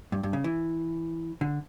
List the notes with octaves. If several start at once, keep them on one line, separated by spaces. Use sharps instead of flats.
G2
G2
C#3
E3
D3